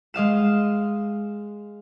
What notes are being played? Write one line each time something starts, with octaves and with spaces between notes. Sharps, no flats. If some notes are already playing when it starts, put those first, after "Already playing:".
G#3 D#5 F5 E7